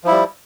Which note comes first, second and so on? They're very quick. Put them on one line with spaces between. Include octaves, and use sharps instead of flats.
F3 E4 G3